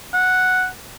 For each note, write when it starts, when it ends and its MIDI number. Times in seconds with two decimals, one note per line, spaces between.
0.14 0.67 78